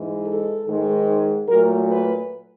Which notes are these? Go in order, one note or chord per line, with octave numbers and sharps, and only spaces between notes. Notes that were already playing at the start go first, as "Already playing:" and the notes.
Already playing: G#2 E3 G#3
A4
G#2 D#3 G#3
A#2 F#3 A3 A#4
B4